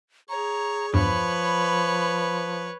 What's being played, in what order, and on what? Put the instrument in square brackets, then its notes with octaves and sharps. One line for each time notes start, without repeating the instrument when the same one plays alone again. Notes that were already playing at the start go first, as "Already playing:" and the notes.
[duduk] G#4 [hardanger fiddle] C#5 [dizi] A#5
[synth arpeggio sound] E2 G2 B2 [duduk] F3 [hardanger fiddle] B4 C#5 [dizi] B5